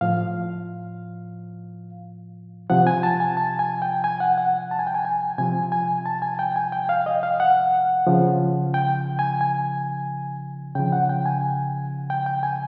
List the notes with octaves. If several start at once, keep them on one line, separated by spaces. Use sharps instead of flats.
A2 F3 F5
C3 F3 F#5
G#5
A5
G#5
A5
G#5
G5
G#5
F#5
F#5
A5
G#5
G5
G#5
G#5
C3 F3 G#5
G#5
A5
G#5
G5
G#5
G5
F5
D#5
F5
F#5
C#3 F3
G5
G#5
G#5
C#3 F3 G5
F#5
G5
G#5
G5
G5
G#5